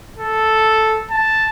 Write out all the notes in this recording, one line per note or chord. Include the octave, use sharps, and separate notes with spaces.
A4
A5